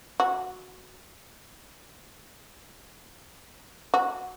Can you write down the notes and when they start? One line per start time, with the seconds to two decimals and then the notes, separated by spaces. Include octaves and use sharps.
0.20 F#4
3.94 F#4